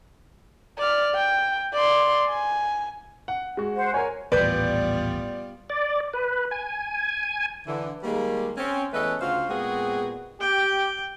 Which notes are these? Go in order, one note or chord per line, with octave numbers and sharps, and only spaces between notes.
D5 F6
G5
D5 C6
G#5
F#5
G#3 F#4
C5 F#5
A#4 C#5 G#5
D#1 A1 G3 B3 F4 B4 D5 G6
D5
B4
G#5
D3 E3
D#3 G3 G#3 A#3
C4 C#4
E2 A3 C#4 A4 B4 D#5
D2 C#3 F4 F#4 C5 F5
A#2 G#3 B3 C4 F#4 G#4
G4 G5